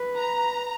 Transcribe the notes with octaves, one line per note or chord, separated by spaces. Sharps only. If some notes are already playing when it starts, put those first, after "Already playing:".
Already playing: B4
A#5